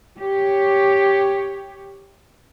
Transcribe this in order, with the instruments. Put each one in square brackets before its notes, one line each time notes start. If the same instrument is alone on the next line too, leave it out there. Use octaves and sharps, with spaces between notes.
[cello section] G4 C#5